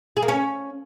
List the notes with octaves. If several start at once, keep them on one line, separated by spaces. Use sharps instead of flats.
G#4
A#3
C#4